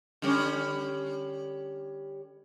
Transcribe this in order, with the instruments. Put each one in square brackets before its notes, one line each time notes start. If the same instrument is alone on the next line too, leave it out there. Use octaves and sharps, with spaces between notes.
[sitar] D3 G3 C#4